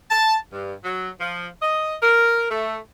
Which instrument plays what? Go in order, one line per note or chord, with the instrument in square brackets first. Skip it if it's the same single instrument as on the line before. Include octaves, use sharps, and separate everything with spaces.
[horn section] A5
G2
F#3
F3
D#5
A#4
A3